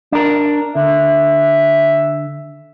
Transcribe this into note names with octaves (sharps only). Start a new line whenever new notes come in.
D4 A#4
D3 E5